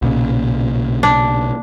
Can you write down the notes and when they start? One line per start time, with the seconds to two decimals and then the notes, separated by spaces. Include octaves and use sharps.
0.02 B1 A#2 C#3
1.03 D4